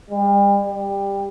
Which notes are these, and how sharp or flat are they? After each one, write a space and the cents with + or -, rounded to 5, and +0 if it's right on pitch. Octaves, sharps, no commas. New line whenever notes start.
G3 +40
G3 +15